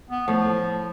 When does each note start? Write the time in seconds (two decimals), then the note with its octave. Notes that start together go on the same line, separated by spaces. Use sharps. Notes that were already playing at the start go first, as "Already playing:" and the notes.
0.10 B3
0.28 A2 F3